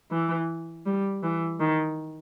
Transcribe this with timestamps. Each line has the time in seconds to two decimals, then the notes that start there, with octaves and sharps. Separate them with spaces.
0.11 E3
0.86 G3
1.23 E3
1.60 D#3